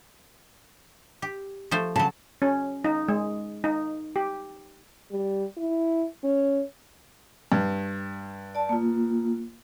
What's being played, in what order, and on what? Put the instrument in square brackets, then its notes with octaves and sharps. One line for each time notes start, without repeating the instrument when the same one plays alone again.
[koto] G4
F3 A3 C5
[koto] C#3 F#3 [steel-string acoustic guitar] A5
[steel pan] C#4
D#4
G#3
D#4
G4
[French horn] G3
E4
C#4
[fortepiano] G2
[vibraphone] D5 A5
A#3 F4